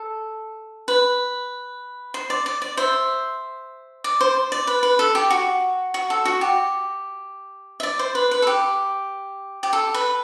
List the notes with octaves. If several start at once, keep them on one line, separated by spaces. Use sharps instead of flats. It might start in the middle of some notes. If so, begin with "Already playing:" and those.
Already playing: A4
B4
C5
D5
D5
D5
C5 E5
D5
C5
D5
B4
B4
A4
G4
F#4
F#4
A4
F#4
G4
E5
D5
C5
B4
B4
A4
G4
G4
A4
B4